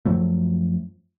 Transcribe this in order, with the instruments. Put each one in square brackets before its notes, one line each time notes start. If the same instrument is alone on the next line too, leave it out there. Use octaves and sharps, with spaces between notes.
[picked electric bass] F#2 F3 F#3 A3